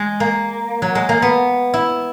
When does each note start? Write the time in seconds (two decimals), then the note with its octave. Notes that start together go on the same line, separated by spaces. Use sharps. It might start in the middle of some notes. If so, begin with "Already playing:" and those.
Already playing: G#3
0.20 A#3
0.82 F#3
0.95 G#3
1.09 A#3
1.22 B3
1.74 E4